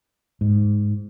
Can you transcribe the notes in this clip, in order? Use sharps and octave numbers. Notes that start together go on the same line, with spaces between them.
G#2